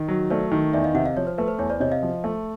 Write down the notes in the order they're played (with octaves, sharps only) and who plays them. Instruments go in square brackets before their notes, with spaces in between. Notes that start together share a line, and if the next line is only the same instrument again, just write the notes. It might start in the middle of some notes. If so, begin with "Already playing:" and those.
Already playing: [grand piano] D#3
F#3
[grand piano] A3 [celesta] C5 D5
[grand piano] D#3
[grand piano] E2 [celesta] D5 E5
[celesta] D#5 F5
[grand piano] C3 [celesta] E5 F#5
[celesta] D#5 F5
[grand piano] F3 [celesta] C#5
[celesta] C5
[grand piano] A3 [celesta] B4
[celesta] C5
[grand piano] E2 [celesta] C#5
[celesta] C5 D5
[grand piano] C3 [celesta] C#5 D#5
[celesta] D#5 F5
[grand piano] F3
A3